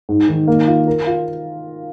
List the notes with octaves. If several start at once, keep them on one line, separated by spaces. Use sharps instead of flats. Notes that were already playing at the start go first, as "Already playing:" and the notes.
G#2
D#3
A#3
F4
A#4
F4